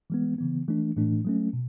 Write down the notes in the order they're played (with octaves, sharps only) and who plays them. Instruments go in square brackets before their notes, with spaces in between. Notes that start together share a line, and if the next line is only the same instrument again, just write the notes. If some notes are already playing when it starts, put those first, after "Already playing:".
[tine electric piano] E3 G#3 B3
C#3 E3 B3
E3 A3 D4
A2 E3 A3 D4
F#3 A3 C#4
B2